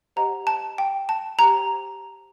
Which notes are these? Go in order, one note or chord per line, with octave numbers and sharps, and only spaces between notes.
G4 C5 D#5 F#5 A#5
A5
G5
A5
G4 C5 G5 A#5